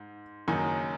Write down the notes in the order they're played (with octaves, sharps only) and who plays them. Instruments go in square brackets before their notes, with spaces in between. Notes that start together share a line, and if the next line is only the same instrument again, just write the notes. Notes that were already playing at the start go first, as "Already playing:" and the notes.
Already playing: [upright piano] G#2
F#1 F#2 D#3 A#3 D#4 G#5